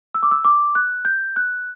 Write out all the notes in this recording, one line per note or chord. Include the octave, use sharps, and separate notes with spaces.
E6
D6
E6
D6
F#6
G6
F#6